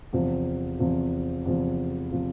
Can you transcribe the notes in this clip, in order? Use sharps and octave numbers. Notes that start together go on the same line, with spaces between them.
E2 C3 F3
E2 C3 F3
E2 C3 F3
C3 F3